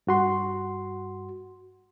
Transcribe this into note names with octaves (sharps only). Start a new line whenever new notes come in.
G2 F#4 C6